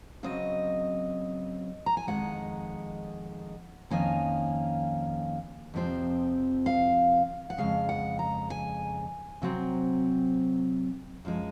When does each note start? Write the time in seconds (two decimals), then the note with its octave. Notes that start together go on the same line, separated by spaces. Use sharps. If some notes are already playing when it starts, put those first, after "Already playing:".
0.23 C#3 F#3 C4 D#5
1.86 A#5
1.97 G#5
2.07 F2 C3 D#3 G#3 F#5
3.90 F2 D#3 A#3 C#4 G#5
5.74 F2 C3 F3 C4
6.66 F5
7.50 F#5
7.58 F2 C#3 G#3 F5
7.89 F#5
8.19 A#5
8.50 G#5
9.42 C3 F#3 C4
11.25 F#2 F3 G#3